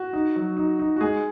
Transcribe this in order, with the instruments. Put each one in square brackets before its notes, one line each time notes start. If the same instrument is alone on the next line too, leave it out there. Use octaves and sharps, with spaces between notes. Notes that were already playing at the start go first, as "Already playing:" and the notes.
Already playing: [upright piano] F#4
[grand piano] D#4
F#3
D#4
D#4
[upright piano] F#4
[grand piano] G#3 [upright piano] G#4